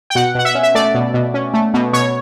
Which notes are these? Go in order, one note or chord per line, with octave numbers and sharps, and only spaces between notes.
G5
B2 F#5
B2 F#5
E5
C#4
E5
A3 D5
B2
B2
C#4
A3
B2
B2 C#5